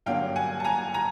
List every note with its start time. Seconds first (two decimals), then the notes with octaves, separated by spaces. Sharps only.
0.06 G2 D3 F#3 A#3 C#4 F5 G5
0.36 F#5 G#5
0.60 A5
0.65 G#5 A#5
0.94 G#5 A#5